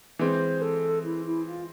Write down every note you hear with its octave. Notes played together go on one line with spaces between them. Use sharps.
E3 G#3 C4 C5
A4
E4
E4
F4